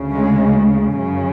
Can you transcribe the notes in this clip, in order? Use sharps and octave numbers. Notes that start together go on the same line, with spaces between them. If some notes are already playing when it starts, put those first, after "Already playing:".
Already playing: D2 C#3
G#3
F#2 C#3